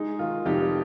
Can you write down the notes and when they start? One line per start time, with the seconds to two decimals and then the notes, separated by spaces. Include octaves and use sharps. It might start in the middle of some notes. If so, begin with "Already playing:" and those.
Already playing: G#3 D#4
0.19 D#3 F4
0.45 F1 D#4 G4